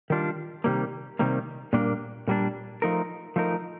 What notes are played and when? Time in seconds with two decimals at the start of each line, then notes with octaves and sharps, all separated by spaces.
0.10 D#3 G3 D4 F4
0.64 C3 D#3 G3 A#3
1.19 C3 D#3 G3 A#3
1.73 A#2 G3 A#3 D4
2.28 A#2 G3 A#3 D4
2.82 F3 A3 D#4 A#4
3.36 F3 A3 D#4 A#4